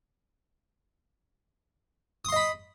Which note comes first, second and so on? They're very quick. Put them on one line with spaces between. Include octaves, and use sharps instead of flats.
D#6 C6 D#5 B5